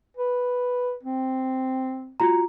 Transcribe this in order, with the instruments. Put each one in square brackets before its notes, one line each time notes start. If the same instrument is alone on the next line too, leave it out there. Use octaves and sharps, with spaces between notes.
[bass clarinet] B4
C4
[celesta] F4 F#4 A#5